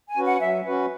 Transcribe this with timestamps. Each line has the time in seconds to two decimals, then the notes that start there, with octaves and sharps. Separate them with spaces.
0.08 G#5
0.17 C#4 F#4 B4
0.25 F#5
0.41 F#3 E5
0.66 C#4 F#4 B4